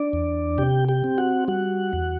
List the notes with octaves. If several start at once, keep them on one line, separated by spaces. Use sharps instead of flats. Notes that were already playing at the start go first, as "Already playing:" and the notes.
Already playing: D4 D5
E2
C3 G4 G5
G4 G5
C4
F#4 F#5
G3 F#4 F#5
E2